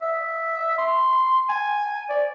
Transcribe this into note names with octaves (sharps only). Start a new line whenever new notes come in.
E5
C6
G#5
D5